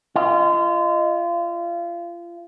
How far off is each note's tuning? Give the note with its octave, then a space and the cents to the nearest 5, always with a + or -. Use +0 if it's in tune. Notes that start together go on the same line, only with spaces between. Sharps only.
F4 -30 D#5 +0